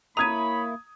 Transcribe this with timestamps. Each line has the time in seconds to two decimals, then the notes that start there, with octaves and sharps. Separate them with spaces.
0.17 A#3 E4 C#5 A#5 B5 D#6 G#6 D#7